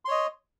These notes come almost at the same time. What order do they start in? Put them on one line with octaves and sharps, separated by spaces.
C6 C#5 D#5